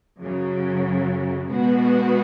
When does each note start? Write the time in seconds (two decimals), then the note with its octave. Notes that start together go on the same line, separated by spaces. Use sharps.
0.20 F#2 C#3 F#3
1.47 B2 G#3 B3 F#4